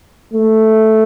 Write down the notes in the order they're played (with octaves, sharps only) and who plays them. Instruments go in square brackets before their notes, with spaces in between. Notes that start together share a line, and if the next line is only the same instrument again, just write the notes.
[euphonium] A3